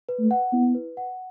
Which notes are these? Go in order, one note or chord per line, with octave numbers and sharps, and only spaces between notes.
B4
A3
F#5
B3 E4
B4
F#5